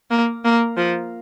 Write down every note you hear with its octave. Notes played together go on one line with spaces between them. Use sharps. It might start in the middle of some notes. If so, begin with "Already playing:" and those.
A#3
A#3
F3